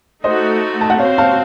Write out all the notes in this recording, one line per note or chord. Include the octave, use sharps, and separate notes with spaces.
A3 D#4 F#4 C5 D#5
A5
F#5
C4 F#4 C5 C#5 F5
F5 A5